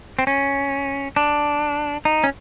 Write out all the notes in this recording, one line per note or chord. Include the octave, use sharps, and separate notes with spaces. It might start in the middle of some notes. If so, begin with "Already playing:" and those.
C4
C#4
D4
D#4
C#4